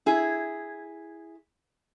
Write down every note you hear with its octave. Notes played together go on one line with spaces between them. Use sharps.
E4 G#4